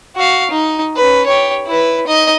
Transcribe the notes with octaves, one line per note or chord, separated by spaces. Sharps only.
F#4 F5
D#4
C#4 B4
G4 C#5
E4 B4
D#4 D#5